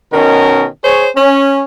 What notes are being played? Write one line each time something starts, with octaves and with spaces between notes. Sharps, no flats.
B2 D#3 C#4 A#4
G#4 C5 C#5
C#4